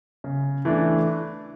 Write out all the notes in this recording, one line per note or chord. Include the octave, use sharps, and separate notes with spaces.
C#3
E3 A3 D4